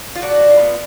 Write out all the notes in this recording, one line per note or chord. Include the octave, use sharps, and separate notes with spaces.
F4
D4 F#4
D4
F4
B3